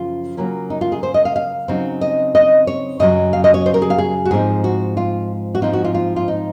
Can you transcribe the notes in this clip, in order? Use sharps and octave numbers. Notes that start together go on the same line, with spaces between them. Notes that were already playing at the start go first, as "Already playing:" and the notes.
Already playing: F#2 C#3 F3 F4
C#3 F#3 A#3 C#4
D#4
F4
G#4
C5
D#5
F5
F5
C#3 F#3 C4 D#4
D#5
D#5
C#5
F#2 C#3 F#3 D#5
F5
D#5
C#5
C5
A#4
G#4
F5
G#4
F#4
G#2 F3 C4 D#4 G#4
F#4
F4
F#4
G#2 F3 C4 D#4 F4
F#4
F4
F4
F4
D#4